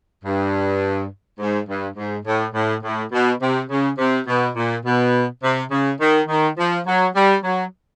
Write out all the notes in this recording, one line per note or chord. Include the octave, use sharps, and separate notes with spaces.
G2
G#2
G2
G#2
A2
A2
A2
B2
C3
C#3
C3
B2
A#2
B2
C3
C#3
D#3
D#3
F3
F#3
G3
F#3